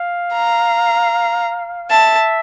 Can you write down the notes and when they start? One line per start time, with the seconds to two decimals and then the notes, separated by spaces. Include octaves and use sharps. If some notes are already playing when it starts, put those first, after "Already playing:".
Already playing: F5
0.34 A#5
1.90 E5 A5